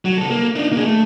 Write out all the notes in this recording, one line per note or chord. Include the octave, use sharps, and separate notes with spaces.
F#3
C2 A4
A#3
D4 D#4
A#3 G#4
A3